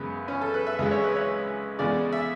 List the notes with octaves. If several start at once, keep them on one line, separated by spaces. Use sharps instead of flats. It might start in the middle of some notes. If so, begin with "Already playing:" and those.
Already playing: F#2 C#3 G#3 B3
C#4
A4
B4
E5
C#2 C#3 G#3 E5
C#5
B4
C#5
E2 C#3 G#3 D5
E5